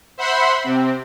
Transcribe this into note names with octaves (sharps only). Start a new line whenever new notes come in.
C5 E5 F#5 B5 C6
C3 C4